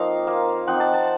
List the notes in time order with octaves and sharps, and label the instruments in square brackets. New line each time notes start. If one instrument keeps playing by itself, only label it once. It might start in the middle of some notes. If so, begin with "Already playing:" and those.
Already playing: [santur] F3 A#3 C4 D#4 D#5 F5
A#3 F4
F3 C4 D#4 F#5
A5
A5